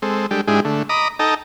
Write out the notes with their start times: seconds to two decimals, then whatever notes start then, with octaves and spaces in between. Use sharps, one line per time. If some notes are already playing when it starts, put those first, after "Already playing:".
0.02 G#3 C4 A4
0.31 G3 G#3 D4 G4 A4
0.48 G#2 G#3 D4 E4 G4 G#4
0.65 D3 A3
0.89 D#5 A#5 B5 D6 D#6
1.19 D#4 A4 D#5 G5 A5 A#5